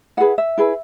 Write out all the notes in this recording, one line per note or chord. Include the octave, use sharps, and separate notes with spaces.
E4 G#4 B4 F#5
E5
E4 G#4 B4